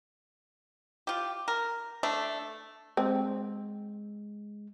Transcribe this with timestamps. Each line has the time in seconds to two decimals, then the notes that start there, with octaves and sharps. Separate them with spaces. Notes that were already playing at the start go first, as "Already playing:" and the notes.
1.07 F4 G4
1.48 A#4
2.03 A3 D4
2.97 G#3 C4